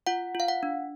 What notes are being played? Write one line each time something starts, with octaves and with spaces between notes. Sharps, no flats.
F4 F#5
F4 F5
F#5
D4